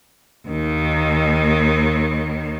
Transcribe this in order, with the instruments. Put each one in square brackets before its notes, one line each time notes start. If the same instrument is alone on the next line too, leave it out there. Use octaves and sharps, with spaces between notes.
[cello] D#2 D#3